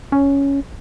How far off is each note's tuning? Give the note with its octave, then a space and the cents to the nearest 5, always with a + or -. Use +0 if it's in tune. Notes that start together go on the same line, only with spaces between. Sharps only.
C#4 +5